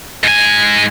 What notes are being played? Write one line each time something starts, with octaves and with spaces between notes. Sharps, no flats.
G#2 G#5